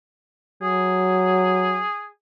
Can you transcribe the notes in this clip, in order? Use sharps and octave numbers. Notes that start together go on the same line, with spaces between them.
F#3 G#4